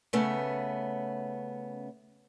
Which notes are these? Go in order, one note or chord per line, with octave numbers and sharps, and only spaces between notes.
C#3 A3 B3 C#4